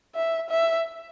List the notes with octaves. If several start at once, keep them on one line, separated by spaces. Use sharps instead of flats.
E5
E5